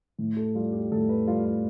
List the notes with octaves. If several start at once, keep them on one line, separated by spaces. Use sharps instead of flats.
A2
A4
G3 F4
G4
A2 A4
B4
G3 F4
F4